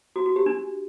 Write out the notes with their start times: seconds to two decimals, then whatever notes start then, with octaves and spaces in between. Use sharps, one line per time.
0.16 F#4
0.26 F#4
0.36 G4
0.46 D4